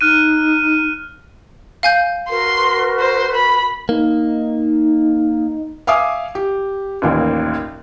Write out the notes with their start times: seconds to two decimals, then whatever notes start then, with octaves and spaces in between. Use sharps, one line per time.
0.01 D#4 F6 F#6 D#7
1.83 F5 G#5 G6
2.30 F#4 A#4 B4 C6
3.00 C5
3.35 B5
3.89 A#3 D#4
5.87 E5 F5 G#5 D6 D#6
6.35 G4
7.02 A1 D#2 A#2